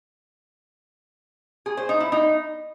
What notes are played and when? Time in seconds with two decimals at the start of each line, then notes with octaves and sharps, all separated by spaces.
1.66 G#4
1.77 C5
1.89 D#4
2.00 E4
2.12 D#4